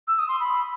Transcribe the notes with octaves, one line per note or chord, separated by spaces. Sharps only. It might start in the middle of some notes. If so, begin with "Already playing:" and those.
E6
D#6
C6
B5